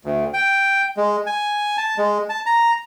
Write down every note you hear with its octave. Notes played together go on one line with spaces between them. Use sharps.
D2
G5
G#3
G#5
A5
G#3
A5
A#5